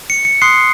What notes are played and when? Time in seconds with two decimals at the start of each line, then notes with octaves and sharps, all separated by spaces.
0.10 C#7
0.25 C#7
0.42 C6 D#6 F#6 C7